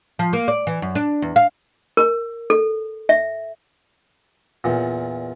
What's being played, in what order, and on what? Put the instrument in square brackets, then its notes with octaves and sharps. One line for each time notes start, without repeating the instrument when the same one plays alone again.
[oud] F3
A#3
D5
E3
F#2
D4
E2
F5
[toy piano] A#4
A4
E5
[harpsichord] E2 A#2